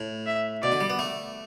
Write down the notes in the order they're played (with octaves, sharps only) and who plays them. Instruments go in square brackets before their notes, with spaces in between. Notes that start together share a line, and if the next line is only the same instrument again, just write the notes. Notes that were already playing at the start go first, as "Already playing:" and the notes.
Already playing: [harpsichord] A2
[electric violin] E5
[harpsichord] B2 [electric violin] D5
[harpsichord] D3
G3
B3
A3